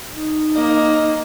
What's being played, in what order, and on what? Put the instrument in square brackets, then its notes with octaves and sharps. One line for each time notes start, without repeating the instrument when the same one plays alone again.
[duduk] D#4
[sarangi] A#3 [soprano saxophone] D#5